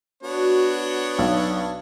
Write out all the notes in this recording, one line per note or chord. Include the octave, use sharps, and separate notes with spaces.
B3 D4 F#4 C#5
B1